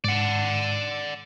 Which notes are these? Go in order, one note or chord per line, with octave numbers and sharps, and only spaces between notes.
G#2 D5 F#5